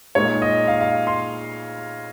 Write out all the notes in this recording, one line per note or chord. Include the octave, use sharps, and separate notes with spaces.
A#2 G#3 D#4 C#5
D#5
F5
F5
C6